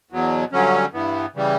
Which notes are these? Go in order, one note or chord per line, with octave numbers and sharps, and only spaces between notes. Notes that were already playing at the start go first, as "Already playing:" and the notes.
E2 B2 F#3
G2 D3 F#3 C#4
G2 E3 B3
C#3 E3 G3